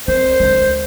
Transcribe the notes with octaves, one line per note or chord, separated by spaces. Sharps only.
C4 C5
D2 G#3